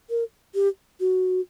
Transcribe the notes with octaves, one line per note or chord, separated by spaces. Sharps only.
A#4
G4
F#4